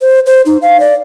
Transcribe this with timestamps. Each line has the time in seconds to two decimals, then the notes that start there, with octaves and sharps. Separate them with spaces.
0.01 C5
0.26 C5
0.46 D#4
0.62 F5
0.80 D5